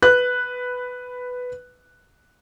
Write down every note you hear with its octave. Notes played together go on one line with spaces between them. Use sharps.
B4 F#6